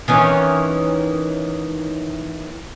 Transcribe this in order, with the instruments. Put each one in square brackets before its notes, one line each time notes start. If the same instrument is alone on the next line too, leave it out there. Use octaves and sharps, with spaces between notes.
[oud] D#3 E3 C#4